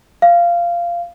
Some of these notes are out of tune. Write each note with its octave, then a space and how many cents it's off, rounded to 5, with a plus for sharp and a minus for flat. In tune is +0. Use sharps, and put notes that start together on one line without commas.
F5 -15